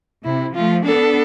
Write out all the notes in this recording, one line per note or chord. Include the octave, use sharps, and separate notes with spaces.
C3 E4
F3 A3 F4
B3 D4 A4